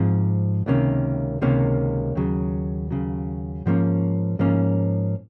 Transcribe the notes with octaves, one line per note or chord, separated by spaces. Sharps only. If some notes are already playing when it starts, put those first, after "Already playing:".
Already playing: G#2 F3 C4
C#2 C3 D#3 A#3 C#4
C#2 C3 D#3 A#3 C#4
D#2 C#3 F#3
D#2 C#3 F#3
G#2 F3 A#3 C#4
G#2 F3 A#3 C#4